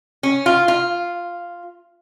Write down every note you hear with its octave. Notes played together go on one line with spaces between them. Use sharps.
C#4
F4
F4